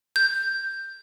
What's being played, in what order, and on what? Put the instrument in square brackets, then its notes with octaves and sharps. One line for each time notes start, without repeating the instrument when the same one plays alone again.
[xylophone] G6